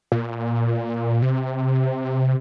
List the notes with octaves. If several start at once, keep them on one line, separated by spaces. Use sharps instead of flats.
A#2
C3